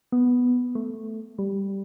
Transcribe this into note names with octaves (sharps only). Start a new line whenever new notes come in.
B3
A3
G3